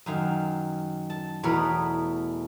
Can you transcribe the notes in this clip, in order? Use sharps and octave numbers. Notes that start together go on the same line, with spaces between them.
F#2 D#3 F5
A5
E2 B2 A3 A#4 C#5 B5